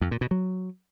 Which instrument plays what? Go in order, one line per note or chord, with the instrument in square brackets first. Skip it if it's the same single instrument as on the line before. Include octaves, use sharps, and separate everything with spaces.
[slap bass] F2
A#2
B2
F#3